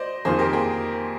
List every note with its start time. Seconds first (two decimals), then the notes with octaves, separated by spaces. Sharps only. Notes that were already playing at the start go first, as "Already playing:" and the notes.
Already playing: C5 D5 D#5
0.25 F2 D#3 A#3 F4 G#4 C5
0.39 G4 A#4
0.53 G#4